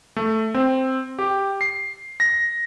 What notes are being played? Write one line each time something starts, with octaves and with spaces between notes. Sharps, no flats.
A3
C4
G4
C7
A#6